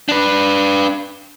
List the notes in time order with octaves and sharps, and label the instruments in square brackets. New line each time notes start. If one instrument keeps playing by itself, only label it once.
[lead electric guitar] D4 B4